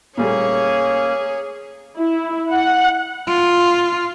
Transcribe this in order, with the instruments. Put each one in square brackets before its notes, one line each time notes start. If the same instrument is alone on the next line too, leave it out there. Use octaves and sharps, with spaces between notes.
[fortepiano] A#2 G3 A3 [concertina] A#3 C#4 [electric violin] G#4 [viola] C#5
[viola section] E4
F#5
[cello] F4